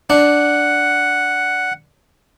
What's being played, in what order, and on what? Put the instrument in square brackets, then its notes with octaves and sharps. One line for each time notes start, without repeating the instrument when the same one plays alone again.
[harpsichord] D4 [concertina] F#5